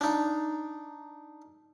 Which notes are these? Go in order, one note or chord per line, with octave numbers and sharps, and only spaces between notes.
D4 D#4